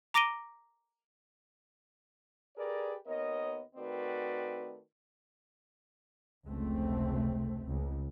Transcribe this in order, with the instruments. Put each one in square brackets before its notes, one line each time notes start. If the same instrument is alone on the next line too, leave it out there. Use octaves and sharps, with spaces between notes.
[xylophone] A#5 D6 A#6 D7 D#7 G7
[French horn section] G4 G#4 A#4 B4 D5
D#2 B3 A#4 C#5 D#5
D#3 A3 C4 F#4 B4 D5
[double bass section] F1 C#2 A3 C4
C#2